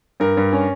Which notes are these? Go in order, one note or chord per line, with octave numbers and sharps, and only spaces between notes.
G2 A#4
G2
C#4